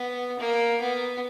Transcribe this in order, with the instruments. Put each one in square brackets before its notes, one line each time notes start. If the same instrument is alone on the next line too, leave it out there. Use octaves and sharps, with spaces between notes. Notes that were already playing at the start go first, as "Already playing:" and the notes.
Already playing: [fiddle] B3
A#3
B3